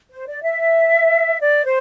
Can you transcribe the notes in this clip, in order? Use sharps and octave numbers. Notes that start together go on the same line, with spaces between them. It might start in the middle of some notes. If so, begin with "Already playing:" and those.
C5
D5
E5
D5
C5